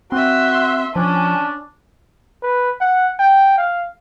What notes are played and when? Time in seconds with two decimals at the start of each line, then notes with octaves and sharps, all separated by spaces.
0.12 C4 F#4 E5 C6
0.96 F3 C#4 D4 D5 A5
2.42 B4
2.81 F#5
3.19 G5
3.58 F5